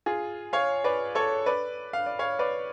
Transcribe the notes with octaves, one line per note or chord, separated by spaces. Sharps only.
F4 G#4
C#5 F5
B4 D5
A4 C#5
B4 D5
F5
D5
C#5 F5
B4 D5